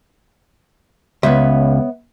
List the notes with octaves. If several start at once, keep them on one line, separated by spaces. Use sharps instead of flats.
C#2 B3 C#5 E5